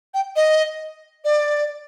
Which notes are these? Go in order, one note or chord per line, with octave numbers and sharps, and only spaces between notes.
G5
D#5
D5